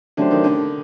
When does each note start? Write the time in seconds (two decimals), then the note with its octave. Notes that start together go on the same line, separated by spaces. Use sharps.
0.17 D3 F#3 A3 D4 G4 C5
0.31 D#3
0.44 D3